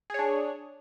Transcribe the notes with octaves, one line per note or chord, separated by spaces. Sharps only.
D4 G#4 C#5